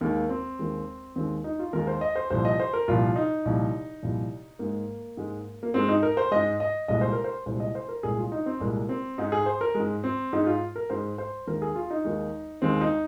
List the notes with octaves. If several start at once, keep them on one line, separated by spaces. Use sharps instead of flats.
D#2 D#3 G#3 A#3
C4
D#2 D#3 G#3
D#2 D#3 G#3 C4
D#4
F4
D#2 D#3 G#3 A#4
C5
D#5
C5
C2 A#2 F3 C5
D#5
C5
A#4
C2 A#2 F3 F4
D#4
C2 A#2 F3
C2 A#2 F3
G#2 G#3 A#3
G#2 G#3
A#3
G#2 G#3 C4
D#4
A#4
C5
G#2 G#3 D#5
D#5
C2 A#2 G#3 D#5
C5
A#4
C5
C2 A#2 G#3 C5
D#5
C5
A#4
C2 A#2 G#3 G#4
F4
D#4
C4
C2 A#2 G#3 A#3
C4
G#2 G#3 D#4
G#4
C5
A#4
G#2 G#3
C4
G#2 G#3 D#4
F4
A#4
G#2 G#3 C5
C5
D#2 D#3 G#3 A#4
G#4
F4
D#4
D#2 D#3 G#3
D#2 D#3 G#3 C4
D#4